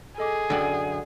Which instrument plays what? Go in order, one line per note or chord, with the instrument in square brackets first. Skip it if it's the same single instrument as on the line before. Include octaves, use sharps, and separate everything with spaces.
[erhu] G#4 [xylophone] A4 D#5 D6
[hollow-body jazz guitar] F#2 D3 [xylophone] D5 G5 F#7